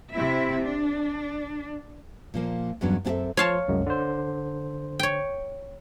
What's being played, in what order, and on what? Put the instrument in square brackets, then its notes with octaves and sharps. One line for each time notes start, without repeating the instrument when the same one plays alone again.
[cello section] C3 C4 E4 E5
D4
[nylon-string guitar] A#2 F3 A#3
E2 G2 F#3 B3 C#4 D4
F#2 C4 E4 G4 A4 E5
[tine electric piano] F3 C6 [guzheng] C#5 F5 A5
[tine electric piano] C2 F#2 G#3
D3 C5
[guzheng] C#5 G5